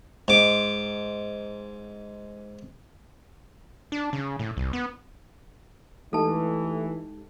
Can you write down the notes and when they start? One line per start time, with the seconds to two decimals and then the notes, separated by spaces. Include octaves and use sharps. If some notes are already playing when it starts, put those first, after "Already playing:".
0.28 G#2 D6
3.92 D4
4.13 C#3
4.39 A2
4.57 C2
4.73 B3
6.13 E3 G#3 A3 D#4 G4 A4 A5